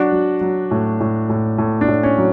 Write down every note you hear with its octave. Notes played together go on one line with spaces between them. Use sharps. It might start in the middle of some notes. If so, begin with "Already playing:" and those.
Already playing: F#3 D4 F#4
F#3
F#3
A2
A2
A2
A2
D4
A2
C#4
F#3